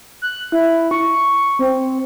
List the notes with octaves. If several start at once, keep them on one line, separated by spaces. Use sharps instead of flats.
F#6
E4
C#6
C4